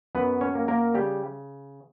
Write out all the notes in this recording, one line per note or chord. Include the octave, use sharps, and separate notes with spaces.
F#2 B3 B4
C#4 C#5
A#3
A#3 A#4
C#3 G3 G4